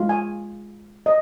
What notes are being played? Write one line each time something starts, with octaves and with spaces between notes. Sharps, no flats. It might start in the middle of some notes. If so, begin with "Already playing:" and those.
Already playing: G#3 F4
G#5
D#5